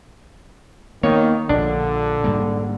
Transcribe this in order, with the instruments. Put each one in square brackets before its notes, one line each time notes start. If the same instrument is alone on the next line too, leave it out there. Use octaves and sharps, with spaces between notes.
[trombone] D#3 [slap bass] A#3 B3 [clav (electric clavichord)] C#5
[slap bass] A#1 A#2 [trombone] D3 [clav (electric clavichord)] D4
[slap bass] G#2 G3 A#3